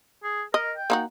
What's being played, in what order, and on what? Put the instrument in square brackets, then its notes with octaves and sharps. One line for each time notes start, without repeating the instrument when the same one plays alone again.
[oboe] G#4
[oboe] A#4 [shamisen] D#5
[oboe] G5
[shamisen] A#3 D#4 F#4